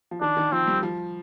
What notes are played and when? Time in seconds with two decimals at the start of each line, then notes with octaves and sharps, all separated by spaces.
0.11 F3
0.21 D#3 D4
0.37 D#3
0.52 F3 C4
0.67 G3
0.83 F3